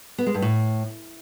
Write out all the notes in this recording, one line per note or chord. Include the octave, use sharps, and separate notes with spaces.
B3
G#3
G2
A2